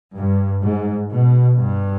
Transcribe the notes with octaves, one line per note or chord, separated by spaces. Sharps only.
G2
G#2
B2
G2